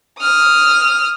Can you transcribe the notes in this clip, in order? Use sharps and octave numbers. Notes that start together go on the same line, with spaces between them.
D#6 F6